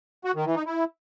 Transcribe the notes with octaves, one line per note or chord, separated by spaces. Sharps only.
F#4
D#3
E3
D#4
E4